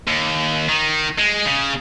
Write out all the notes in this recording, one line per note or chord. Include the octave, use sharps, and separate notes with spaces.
D#2
D#3
G#3
C#3